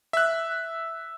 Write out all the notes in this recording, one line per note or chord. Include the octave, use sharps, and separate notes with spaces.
E5 F#6